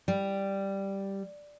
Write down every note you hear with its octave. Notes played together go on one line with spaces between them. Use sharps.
G3